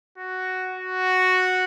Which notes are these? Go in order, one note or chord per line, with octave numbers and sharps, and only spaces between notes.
F#4
F#4